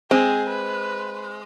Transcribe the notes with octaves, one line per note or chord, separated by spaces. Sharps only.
G#3 C4 G#4
B4